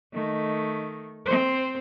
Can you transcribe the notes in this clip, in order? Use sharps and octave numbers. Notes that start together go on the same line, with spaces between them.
D#3 A3
C4 C5